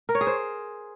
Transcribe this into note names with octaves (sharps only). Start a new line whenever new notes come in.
A#4
C#5
G#4
C5